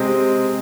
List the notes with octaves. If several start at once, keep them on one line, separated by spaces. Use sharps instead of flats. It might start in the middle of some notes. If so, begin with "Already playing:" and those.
Already playing: C3 G#3 C4